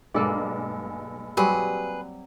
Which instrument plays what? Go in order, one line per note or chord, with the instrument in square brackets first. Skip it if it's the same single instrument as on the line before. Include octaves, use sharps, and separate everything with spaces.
[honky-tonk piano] B1 G2 G#3 [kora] A#3 A4 D5
[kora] F#3 G3 C4 [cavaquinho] G#4 B4